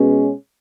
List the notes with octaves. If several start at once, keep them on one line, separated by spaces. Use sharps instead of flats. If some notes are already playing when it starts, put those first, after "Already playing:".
Already playing: B2 G#3 C#4